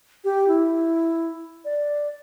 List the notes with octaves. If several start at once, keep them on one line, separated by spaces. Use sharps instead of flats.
G4
E4
D5